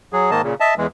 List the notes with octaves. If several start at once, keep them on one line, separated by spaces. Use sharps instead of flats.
F#3 G#4
G#2 D#3 A#3 D#5 A5
A#2 C#3
D#5 E5 A5
E2 E3 G#3